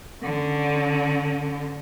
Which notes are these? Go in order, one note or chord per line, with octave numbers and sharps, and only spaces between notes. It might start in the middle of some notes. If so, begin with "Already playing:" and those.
D3 C#4